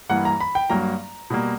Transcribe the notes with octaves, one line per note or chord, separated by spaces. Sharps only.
G2 E3 A#3 F#5
A#5
B5
G5
G2 F#3 A#3 A#5
B2 G3 A#3